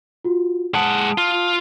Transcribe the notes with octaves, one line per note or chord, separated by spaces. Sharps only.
F4 F#4
G#3 F#5 A5 D#6 D7
F4